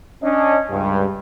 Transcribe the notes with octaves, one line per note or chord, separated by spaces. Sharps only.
C#4 D4 D#5
C#2 G2